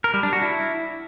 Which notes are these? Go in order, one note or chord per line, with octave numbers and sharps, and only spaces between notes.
A#4
G3
D4
F#4
E4